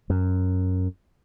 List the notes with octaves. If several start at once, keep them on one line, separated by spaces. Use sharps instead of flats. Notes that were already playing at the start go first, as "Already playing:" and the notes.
F#2